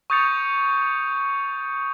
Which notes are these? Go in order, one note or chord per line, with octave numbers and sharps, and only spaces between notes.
C#6 D#6 G6 A6 C#7 F7